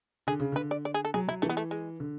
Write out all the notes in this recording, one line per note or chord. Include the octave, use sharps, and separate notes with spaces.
D3 G#4
C#3
D3 B4
D5
D5
G#4
A4
F#3 G#4
F#3 E4
E3 A3
B3
A3
G#3
D3